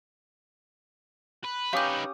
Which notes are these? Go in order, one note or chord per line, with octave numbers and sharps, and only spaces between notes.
B4
C#4 D#4 G4 B4 F5 D#6 G6